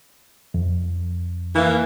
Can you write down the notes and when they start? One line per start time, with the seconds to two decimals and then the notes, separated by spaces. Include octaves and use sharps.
0.54 F2
1.55 E3 A#3